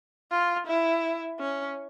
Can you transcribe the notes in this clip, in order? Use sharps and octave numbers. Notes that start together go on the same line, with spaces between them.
F4
E4
C#4